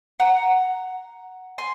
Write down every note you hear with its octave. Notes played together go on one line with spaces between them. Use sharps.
F#5 A#5
G#5 C6